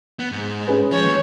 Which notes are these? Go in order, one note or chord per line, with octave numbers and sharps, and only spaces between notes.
B3
G#2 G#3
C#4 G#4 B4
F3 C#5
D#2